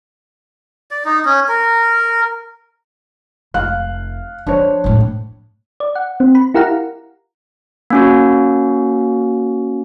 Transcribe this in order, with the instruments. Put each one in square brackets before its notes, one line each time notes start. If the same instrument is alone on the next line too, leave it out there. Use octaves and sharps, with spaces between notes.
[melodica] D5
D#4
C#4
A#4
[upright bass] F1 [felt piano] F5 F#6
[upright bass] F3 [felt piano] D4 C5 C#5
[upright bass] F2 A2
[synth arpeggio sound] D5
F#5
C4
B5
E4 G4 A#4 F5 F#5 A#5
[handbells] A#3 C#4 F#4